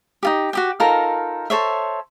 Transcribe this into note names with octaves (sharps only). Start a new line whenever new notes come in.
D#4 F4 G4
F#4 G4 G5
D#4 F4 A4 A#4
A4 C5 C#5 E5